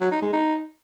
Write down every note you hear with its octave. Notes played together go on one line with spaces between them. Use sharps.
F#3
D#4
G#3
D#4